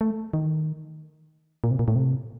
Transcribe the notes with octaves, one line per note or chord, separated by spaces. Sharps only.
A3
D#3
A#2
C3
A#2
A2
C3